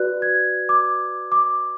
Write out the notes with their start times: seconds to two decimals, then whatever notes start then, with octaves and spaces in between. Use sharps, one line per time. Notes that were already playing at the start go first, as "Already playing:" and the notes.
Already playing: F#4 B4 D5 F#6
0.22 G#6
0.69 D6
1.32 D6